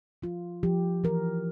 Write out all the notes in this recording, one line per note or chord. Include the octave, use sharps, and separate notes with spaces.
F3 F4
F3 G4
E3 A#4